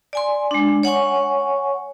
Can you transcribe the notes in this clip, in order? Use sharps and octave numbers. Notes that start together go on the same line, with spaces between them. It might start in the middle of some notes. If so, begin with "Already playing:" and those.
D5 G#5 C6
G#3 D4
C#5 F#5 G#5 C#6